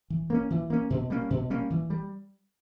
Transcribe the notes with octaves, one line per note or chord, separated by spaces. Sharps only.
E3
A#3 C#4
E3
A#3 C#4
B2
G3 A#3 C#4
B2
G3 A#3 C#4
E3
G3